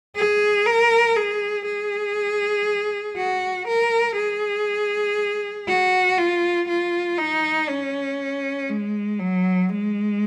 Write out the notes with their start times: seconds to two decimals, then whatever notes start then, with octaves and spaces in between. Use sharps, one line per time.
0.16 G#4
0.66 A#4
1.16 G#4
1.66 G#4
3.17 F#4
3.67 A#4
4.17 G#4
5.68 F#4
6.17 F4
6.68 F4
7.18 D#4
7.69 C#4
8.69 G#3
9.19 F#3
9.69 G#3